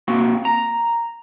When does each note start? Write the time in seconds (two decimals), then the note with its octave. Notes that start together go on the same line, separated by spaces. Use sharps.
0.08 A#3 C4 F#4
0.45 A#5